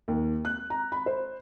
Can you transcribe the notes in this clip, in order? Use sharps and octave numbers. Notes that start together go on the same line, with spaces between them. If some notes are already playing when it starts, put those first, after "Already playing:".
D#2
F#6
A#5
B5
C5